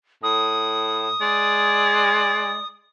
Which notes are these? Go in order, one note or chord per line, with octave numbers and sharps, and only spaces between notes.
A2 D#6
G#3 D5